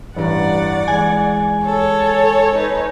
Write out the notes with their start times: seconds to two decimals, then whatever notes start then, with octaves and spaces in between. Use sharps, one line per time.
0.16 A1 G2 D5 F#5 A#5
0.88 E3 G#3 G#5
1.65 A4 C#5
2.55 D#4 B4